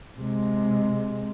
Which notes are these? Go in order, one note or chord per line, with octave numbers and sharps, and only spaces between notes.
C3 G#3